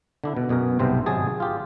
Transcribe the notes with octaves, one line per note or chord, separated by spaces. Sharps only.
D3 D4 E4
B2
F#2 B2 G#4 A#4
B1 G2 C3 C4 C5
G#1 C3 F#3 G#3 G#4 A5
F4 G4